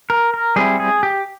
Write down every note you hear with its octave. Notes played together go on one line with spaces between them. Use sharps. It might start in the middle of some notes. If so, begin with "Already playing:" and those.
A#4
A#4
G3 C4 E4 G#4
G#4
G4